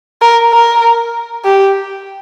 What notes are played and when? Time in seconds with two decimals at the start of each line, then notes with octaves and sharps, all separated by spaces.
0.22 A#4
0.53 A#4
1.45 G4